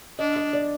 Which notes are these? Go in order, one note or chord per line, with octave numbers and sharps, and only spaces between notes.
D4 D#5
D#5
D5